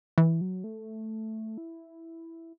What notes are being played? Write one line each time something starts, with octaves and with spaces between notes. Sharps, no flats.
E3
F#3
A3
E4